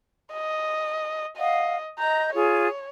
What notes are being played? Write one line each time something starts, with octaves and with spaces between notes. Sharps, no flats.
D#5
D#5 F5 F#5
D#5 A#5 G6
F4 G#4 C#5